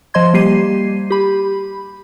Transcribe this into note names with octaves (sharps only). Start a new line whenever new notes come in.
F3 C5 D#5 C6 G#6
G3 A#3 G4 C7 D#7
G4 B5